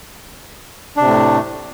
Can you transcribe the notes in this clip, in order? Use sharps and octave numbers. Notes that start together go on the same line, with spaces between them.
A2 C3 A3 D4